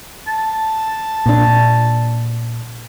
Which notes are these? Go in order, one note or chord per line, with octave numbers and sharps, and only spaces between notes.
A5
A#2 D4